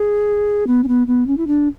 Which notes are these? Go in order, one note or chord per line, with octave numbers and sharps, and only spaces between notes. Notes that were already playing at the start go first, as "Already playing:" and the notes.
Already playing: G#4
B3
C#4
B3
B3
C#4
E4
D4